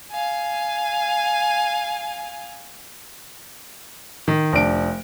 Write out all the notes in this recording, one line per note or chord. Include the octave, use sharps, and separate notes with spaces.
F5 G#5
D#3
F1 D4 D7